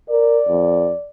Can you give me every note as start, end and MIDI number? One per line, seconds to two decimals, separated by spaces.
0.10 0.40 70
0.10 1.10 74
0.49 0.93 41